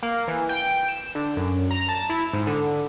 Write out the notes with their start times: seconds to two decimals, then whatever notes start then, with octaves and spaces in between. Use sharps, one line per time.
0.03 A#3
0.28 E3
0.49 G5
0.89 E7
1.15 D3
1.37 F#2
1.71 A#5
1.89 A5
2.09 E4
2.33 G#2
2.47 D3